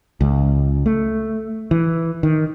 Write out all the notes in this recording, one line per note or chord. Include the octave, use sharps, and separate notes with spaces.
C#2
A3
E3
D#3